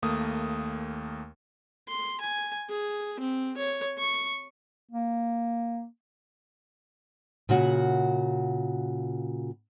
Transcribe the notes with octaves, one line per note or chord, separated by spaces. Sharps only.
D#2 A3 A#3 D#6
C6
G#5
G#4
C4
C#5
C#6
A#3
A#2 C#3 F#4 F#5